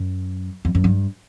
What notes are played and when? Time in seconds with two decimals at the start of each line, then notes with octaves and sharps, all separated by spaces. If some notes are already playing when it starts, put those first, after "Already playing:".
Already playing: F#2
0.65 F2
0.75 F#2
0.84 G2